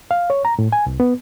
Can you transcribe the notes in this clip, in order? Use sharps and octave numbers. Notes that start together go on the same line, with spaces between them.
F5
C#5
A#5
A2
G#5
C2
B3